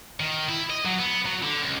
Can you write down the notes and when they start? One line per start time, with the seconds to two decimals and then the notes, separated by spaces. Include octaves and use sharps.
0.20 D#3
0.49 E4
0.70 D#5
0.85 F#3
0.98 B3
1.26 F#3
1.43 D3
1.62 C#2